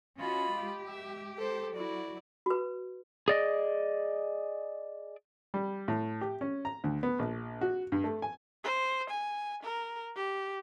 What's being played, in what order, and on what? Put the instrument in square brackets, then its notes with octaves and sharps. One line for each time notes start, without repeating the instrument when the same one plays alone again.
[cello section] C#4 F4 F#4 [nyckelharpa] D#5 B5
[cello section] G#3 G4
[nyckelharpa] E5
A4 C5
[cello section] F#3 F#4 [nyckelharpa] E4 D5
[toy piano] F#4 B4
[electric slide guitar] G#4 D5 D#5
[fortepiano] G3
A2
G4
C#4
A#5
D2
B3
A#1
F#4
G2
A3
G#5
[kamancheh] C5
G#5
A#4
G4